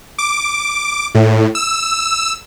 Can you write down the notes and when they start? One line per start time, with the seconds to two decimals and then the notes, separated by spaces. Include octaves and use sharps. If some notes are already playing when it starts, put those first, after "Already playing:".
0.18 D6
1.15 A2
1.55 E6